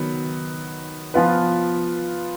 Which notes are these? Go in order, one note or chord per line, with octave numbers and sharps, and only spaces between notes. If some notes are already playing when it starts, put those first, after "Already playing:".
Already playing: D#3 F#3 B3
F3 B3 F4 B4